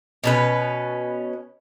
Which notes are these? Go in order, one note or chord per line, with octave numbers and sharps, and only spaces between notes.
B2 C#4 B4